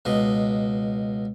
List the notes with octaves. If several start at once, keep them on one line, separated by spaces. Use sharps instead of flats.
C#2 B2 D#5